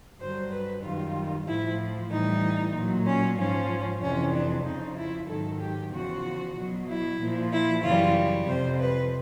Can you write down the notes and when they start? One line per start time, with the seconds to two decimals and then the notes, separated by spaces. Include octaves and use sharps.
0.20 G2 D3 F#3 C5
0.52 B4
0.84 F#2 D#3 G3 F4
1.47 A2 F3 E4
2.11 A2 E3 G3 D#4
2.74 A#2 F#3
3.06 C#4
3.38 G#2 F3 C#4
4.02 F2 C3 E3 C#4
4.34 D4
4.65 F2 C#3 F3 D#4
4.97 E4
5.29 G#2 D#3 F#3 A4
5.61 G4
5.93 E2 C#3 F3 F#4
6.57 B2 F#3
6.88 E4
7.20 A#2 F3
7.52 E4
7.83 F#2 C#3 E3 G3 F4
8.47 F2 C3 F3 C5
8.79 B4